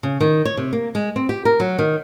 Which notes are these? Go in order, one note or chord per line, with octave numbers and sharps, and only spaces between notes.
C#3
D#3
C#5
C3
A#3
G#3
C4
G4
A#4
F#3
D#3